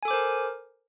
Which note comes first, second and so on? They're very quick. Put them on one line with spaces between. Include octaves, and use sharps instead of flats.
G#5 A4 D6 C5 A#4